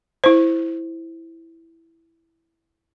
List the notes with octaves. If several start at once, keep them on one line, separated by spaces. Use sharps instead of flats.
E4 C5